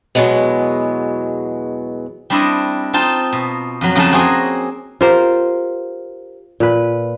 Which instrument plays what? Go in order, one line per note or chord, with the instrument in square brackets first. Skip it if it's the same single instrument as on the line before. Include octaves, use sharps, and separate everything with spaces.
[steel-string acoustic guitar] E2 B2 E3 F#3 G#3 B3
[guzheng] G3 C4 D4 E4 D#5
C4 D#4 F4 A5
B2
F2 F#3
F2 C#3 D#4 G#4 F#5 A5
A#3 C4 F#4 G#4 C#5 D#5
[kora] F4 G4 A#4 C5
A#2 B4